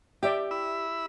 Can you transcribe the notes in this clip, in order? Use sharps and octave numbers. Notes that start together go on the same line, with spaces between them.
G4 D5 E5 G5
E4 B5 E6